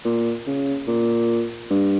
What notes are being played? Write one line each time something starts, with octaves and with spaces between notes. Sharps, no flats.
A#2
C#3
A#2
G2